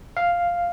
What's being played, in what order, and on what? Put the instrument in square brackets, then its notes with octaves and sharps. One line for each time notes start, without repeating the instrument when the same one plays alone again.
[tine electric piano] F5